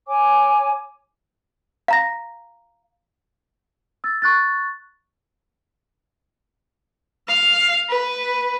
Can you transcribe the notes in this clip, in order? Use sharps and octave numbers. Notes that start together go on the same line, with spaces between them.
C#5 G#5 D6
F5 A#5 A#6
E6 A6
C#6 F#6 A6
F5
B4